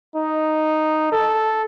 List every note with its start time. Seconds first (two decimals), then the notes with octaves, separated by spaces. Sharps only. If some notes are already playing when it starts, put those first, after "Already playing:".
0.16 D#4
1.12 A4